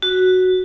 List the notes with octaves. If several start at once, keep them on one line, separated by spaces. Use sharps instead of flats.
F#4